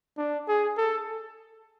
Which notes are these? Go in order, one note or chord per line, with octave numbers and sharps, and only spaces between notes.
D4
G#4
A4